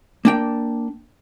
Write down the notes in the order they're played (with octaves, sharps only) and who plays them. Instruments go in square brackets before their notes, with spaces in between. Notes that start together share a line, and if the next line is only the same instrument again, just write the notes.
[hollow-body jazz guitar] A#3 D4 G5